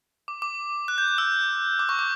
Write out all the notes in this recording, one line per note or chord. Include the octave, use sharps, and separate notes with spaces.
D6
D6
F#6
G6
F#6
E6
D6
C#6
D6